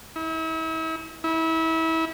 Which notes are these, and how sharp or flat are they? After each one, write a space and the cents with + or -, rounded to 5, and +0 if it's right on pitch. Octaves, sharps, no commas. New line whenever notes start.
E4 -40
E4 -30